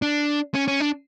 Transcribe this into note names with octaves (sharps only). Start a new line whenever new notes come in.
D4
C#4
C#4
D4